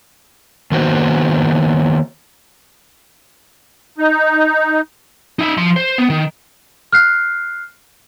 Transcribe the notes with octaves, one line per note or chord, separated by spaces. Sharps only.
D#3 A#3 B3 F#4 C5
D#4
D#4 E5
F3 C6
C5
B3
D#3
F6 F#6 C7